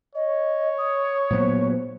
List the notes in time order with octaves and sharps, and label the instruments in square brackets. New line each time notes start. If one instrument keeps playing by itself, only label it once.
[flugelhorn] C#5 [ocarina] D#5
[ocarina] D#6
[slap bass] A#2 F#3 B3 [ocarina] C5